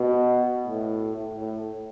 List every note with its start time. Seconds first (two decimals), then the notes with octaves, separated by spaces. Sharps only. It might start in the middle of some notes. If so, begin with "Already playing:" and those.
Already playing: B2
0.64 A2
1.35 A2